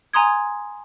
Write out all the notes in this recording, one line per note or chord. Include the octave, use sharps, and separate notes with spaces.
G#5 A#5 C6 D#6 G#6